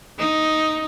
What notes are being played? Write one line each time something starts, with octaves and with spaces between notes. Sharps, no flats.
D#4